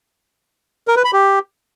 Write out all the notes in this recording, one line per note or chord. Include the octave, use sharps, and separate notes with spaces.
A#4
B4
B5
G4